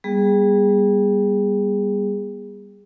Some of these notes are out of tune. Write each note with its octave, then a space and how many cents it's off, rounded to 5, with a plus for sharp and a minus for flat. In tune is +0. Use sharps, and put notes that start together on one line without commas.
G3 +10 B3 -30 G#4 -15